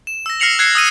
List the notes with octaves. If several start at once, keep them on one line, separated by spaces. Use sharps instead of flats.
E7
E6 A#6
F6 A#6 C7 C#7 F7 F#7
F#6 G#6 C7 C#7
D#6 E6 A#6 D#7